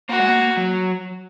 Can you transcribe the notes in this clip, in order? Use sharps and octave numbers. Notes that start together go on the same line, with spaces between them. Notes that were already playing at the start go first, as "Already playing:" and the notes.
A#3 F#4
G#3
A#3
F#3